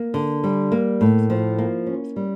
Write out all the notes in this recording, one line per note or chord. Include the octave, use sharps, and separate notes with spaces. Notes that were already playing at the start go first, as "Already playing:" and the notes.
Already playing: A#3
D3
G3
A#3
A2
F3
A#3
C#4
G3